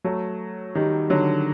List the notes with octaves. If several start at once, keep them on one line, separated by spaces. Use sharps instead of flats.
F#3 A3
D#3 G3
D3 F#3